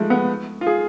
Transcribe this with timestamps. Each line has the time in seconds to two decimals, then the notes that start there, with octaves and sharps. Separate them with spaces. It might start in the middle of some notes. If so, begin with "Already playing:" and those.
Already playing: F3 G#3 A3
0.10 B3
0.61 F4
0.67 G#4